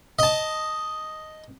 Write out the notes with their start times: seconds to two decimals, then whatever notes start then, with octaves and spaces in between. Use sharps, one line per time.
0.19 D#5 A5